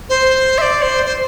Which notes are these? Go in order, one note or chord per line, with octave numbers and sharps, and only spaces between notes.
C5
E5
D5
C5
C5